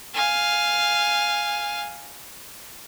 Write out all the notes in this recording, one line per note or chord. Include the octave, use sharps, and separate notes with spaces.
F5 G#5